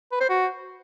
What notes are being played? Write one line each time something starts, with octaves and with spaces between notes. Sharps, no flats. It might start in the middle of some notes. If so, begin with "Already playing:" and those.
B4
C5
F#4